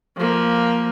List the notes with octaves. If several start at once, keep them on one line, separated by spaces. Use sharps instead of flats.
F3 A#3